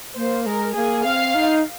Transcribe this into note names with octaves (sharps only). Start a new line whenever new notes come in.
A#3 C5
G#3 A#4
A#3 G#4
C4 F5
D#4